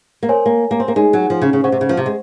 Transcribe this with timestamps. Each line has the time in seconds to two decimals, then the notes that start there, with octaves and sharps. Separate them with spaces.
0.23 A#3
0.29 C4 A#4 C#5 G#5
0.46 A#3
0.71 A#3
0.80 C4
0.88 A#3
0.96 G#3 D#4 G#4 C#5 G#5
1.13 F#3
1.30 F3
1.42 C#3
1.53 C#3
1.64 C#3 C5 F#5 C#6
1.72 C3
1.81 C#3
1.89 F3
1.97 C3
2.06 G#3